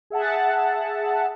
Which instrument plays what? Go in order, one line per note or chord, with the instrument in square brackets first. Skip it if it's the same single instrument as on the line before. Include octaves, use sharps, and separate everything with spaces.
[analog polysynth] G#4 E5 F#5 A5